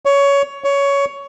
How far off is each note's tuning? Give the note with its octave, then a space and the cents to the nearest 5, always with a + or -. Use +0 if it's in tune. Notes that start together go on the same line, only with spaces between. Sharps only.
C#5 +15
C#5 +15